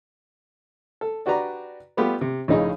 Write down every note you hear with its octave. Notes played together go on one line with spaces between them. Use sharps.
A4
D4 F#4 G4 B4 D5 A#5
G3 A3 B3 F4 G4
C3
A#1 A2 C#3 D#4 G#4 D#5